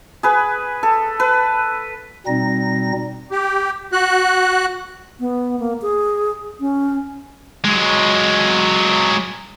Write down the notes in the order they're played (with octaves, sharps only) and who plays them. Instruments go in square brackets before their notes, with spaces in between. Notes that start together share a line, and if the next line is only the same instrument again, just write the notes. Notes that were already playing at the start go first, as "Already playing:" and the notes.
[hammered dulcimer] G#4 B4
A4
B4
[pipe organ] B2 G3 C4 D#4 A#6
[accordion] G4
F#4 F#6
[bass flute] B3
A#3
G#4
C#4
[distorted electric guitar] F#3 G#3